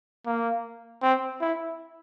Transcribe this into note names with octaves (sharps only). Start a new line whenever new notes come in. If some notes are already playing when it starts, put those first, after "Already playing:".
A#3
C4
E4